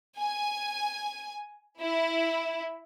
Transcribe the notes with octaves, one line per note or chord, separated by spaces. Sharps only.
G#5
E4